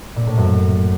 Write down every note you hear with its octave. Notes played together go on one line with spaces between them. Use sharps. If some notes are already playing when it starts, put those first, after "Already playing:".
A#2
A2
F#2